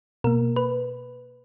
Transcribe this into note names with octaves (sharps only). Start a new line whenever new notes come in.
B2 A#3 A#4
B4